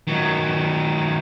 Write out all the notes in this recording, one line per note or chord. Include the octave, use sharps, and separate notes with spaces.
D#3 F#3